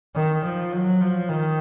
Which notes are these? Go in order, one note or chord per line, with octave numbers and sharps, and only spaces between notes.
D#3
F3
F#3
F3
D#3